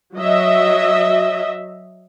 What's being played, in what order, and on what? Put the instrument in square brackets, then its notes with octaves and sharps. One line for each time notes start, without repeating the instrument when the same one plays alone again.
[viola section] F#3 D#5 E5